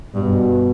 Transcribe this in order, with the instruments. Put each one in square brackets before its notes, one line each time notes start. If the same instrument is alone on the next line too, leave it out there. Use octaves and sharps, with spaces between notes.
[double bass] G2 [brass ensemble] B2